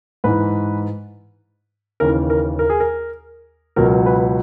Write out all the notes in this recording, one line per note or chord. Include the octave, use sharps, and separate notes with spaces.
G#2 E3 B4
D#2 C#3 E3 A#4
A#4
A#4
G#4
A#4
C#2 B2 F#3 A#4
B4